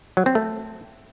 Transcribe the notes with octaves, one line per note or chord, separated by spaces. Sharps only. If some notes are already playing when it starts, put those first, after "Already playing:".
F#3
C4
A3